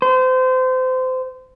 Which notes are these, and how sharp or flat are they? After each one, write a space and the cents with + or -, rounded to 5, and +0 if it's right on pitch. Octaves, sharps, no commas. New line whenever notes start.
C5 -30